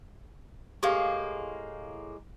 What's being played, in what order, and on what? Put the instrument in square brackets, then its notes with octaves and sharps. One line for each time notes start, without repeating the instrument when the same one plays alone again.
[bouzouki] A2 G#3 A#3 [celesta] G4 F5